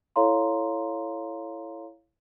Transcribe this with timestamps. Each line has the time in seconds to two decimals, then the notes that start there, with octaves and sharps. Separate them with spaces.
0.16 E4 A4 C#5 F5 A#5 C6